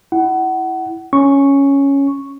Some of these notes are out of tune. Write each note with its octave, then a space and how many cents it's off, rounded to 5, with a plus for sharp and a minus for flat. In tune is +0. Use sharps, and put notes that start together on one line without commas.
E4 +0 F#5 +25
C#4 +0 C#6 +0